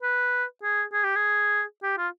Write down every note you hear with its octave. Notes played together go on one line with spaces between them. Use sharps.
B4
G#4
G#4
G4
G#4
G4
F4